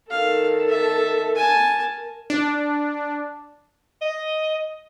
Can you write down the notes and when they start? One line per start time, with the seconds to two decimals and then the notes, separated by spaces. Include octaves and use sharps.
0.10 D#3 A4 F5
0.69 E5 A5
1.36 A#4 G#5 A5
2.30 D4
4.02 D#5